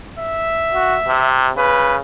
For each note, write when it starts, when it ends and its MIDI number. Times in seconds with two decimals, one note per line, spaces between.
0.18 1.50 76
0.74 0.95 66
1.08 1.50 48
1.57 1.98 49
1.57 1.97 71